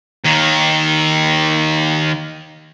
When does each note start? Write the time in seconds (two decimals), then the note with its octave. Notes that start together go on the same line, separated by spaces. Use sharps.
0.25 D#2 D#3